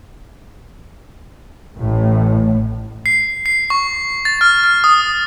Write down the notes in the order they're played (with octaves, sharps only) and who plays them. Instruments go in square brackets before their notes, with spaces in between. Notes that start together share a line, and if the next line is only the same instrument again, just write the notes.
[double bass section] A1 A2
[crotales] C7
C7
C#6
A6
F6
F6
D#6